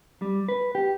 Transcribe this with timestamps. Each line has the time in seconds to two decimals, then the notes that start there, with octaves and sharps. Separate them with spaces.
0.22 G3
0.48 B4
0.75 G4